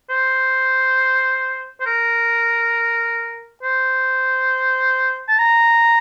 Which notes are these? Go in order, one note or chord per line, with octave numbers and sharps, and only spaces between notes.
C5
C5
A#4
C5
A5
A#5